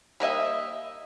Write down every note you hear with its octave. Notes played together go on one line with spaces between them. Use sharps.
G3 A#3 D#5 E5